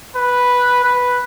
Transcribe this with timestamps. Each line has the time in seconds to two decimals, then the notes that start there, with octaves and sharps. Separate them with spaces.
0.16 B4
0.84 B4